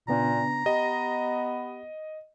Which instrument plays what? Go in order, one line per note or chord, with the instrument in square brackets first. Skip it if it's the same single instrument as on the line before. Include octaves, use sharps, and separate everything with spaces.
[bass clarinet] A#2 [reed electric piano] C#3 B3 D4 [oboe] A#5
[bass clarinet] B3 [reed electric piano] G4 [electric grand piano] D#5